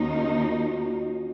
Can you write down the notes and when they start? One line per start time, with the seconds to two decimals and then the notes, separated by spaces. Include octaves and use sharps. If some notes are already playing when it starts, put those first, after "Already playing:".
Already playing: D#2 D#3 A#3 C#4 D#4 F#4
0.18 F4